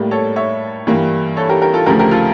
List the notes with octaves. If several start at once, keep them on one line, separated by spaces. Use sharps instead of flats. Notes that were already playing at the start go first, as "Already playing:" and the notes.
Already playing: A2 G3 A#3
A4 C#5
C#5 E5
G2 E3 G3 A#3
A4 C#5
G4 A#4
G4 A#4
F4 A4
D2 C#3 F3 A3 G4 A#4
G4 A#4
F4 A4